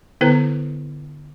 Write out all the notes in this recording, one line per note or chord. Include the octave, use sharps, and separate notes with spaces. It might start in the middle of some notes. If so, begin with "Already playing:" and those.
D3 B3 E4 B4 C5